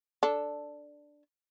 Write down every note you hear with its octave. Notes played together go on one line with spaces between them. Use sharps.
D4 A4